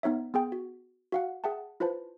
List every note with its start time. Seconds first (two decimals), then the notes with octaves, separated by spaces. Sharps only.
0.03 B3 D#4 C#5 E5
0.34 B3 G#4 G5
0.52 F#4
1.12 F#4 F5 F#5
1.44 G#4 E5 F#5 G5 A5
1.80 E4 F4 B4 C5 A5